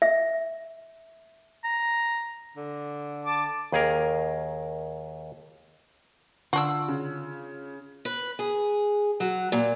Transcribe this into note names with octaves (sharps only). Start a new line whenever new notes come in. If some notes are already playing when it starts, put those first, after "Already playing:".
E5
A#5
D3
A5 D6
D#2 G#4 A#4
D3 D4 F4 F#4 E6
C#3
B4
G#4
F#3
A#2